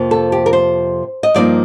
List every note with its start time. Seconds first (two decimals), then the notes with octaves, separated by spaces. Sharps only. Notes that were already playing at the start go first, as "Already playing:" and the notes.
Already playing: F2 C3 F3 A#3
0.11 A4
0.32 G4
0.46 A#4
0.53 C5
1.23 D#5
1.34 G2 F3 A#3 D#4 D5